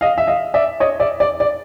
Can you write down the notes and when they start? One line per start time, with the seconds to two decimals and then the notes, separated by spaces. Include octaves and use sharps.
0.01 D#5 F5
0.18 E5
0.27 D#5 F5
0.54 D5 E5
0.80 C#5 D#5
1.00 D5 E5
1.20 D5
1.40 D5